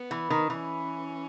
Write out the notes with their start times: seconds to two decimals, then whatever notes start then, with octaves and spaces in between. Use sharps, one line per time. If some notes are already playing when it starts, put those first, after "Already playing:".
Already playing: B3
0.11 E3
0.30 D#3
0.50 E3 C#4